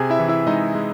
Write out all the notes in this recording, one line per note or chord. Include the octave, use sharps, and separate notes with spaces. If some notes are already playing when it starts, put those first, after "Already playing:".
Already playing: C3 G#4 G#5
E4 E5
E3
E4 E5
G#3 D#4 D#5
G#3